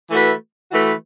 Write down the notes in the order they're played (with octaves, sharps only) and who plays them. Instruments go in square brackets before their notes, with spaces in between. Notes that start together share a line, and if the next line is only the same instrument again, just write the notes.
[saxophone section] E3 A3 F#4 B4
E3 A3 F#4 B4